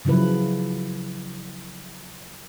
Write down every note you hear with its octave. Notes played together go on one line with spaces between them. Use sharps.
C#3 F3 F#3 E4 B4